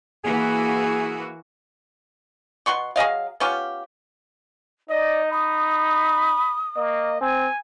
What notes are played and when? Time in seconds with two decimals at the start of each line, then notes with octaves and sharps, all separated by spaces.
0.25 E3 A#3 F#4 G#4
2.66 B2 F#5 C6 C#6
2.96 F#3 G#4 D#5 F5
3.40 B3 C#4 F4 G4
4.89 D#4 D5 D#5
5.31 B5 D#6
6.76 A#3 D#5
7.21 C4 G#5